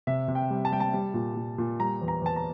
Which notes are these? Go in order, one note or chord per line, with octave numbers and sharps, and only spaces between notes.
C3 E5
C3
G5
G3
A5
G3 G5
A5
G3
A#2
A#2
A#2
G3 A#5
E2
A#5
E2 A5
A#5